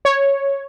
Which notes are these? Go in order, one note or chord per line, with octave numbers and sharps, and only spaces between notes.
C#5